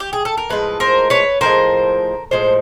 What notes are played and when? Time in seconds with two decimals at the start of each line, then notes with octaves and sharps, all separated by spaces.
0.00 G4
0.13 G#4
0.25 A4
0.38 A#4
0.50 A2 F3 G#3 B4
0.80 A#4 C5
1.10 B4 C#5
1.41 A2 F3 G#3 A#4 C5
2.31 A2 F3 G#3 C5